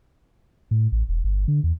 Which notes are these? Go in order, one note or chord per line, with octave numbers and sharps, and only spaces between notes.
A2
A1
E1
G1
D3
E2